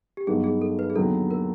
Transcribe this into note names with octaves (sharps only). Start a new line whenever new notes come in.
G4
G2 D#3 F#3 B3 G#4
G#4
A4
B4
G#4
D#2 D3 F#3 B3 A4
A#4